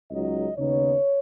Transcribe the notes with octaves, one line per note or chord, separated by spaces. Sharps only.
C#2 C#3 F#3 D#4 D#5
D#2 C#3 B3 D#4 C#5